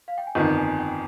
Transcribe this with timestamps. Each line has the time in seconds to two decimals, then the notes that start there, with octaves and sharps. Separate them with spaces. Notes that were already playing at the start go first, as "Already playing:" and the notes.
0.08 F5
0.18 G5
0.27 G#5
0.35 G1 F2 D#3 A#5
0.57 G#5
0.79 G5